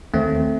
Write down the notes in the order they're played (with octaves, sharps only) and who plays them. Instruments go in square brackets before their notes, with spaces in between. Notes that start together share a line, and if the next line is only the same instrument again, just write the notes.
[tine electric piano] D#2 D#3 A3 C4